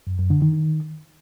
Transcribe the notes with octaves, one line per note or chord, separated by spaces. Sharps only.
F#2
F#2
D3
D#3